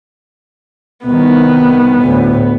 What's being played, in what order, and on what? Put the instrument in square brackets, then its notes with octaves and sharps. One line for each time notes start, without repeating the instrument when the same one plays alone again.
[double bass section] C2 D#3 [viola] B3
[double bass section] D2 A2